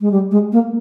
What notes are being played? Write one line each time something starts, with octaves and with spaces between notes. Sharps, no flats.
G#3
G3
G#3
A#3